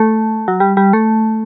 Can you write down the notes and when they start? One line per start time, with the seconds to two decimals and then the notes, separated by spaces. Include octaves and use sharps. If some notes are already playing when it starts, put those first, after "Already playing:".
Already playing: A3
0.48 F#3
0.60 G3
0.77 G3
0.93 A3